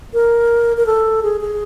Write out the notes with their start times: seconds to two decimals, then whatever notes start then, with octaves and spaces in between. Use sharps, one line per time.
0.14 A#4
0.77 A#4
0.86 A4
1.23 G#4
1.41 G#4